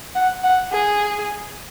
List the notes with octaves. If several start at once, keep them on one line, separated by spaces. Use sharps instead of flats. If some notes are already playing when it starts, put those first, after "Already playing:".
F#5
F#5
G#4